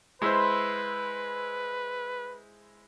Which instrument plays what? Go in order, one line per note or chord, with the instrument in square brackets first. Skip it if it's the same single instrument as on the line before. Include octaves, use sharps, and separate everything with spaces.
[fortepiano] G#3 E4 C5 [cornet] B4 [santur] B5 C6 E6